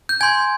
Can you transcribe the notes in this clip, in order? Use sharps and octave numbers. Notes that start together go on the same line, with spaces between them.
G6
G#5 C6 G6 G#6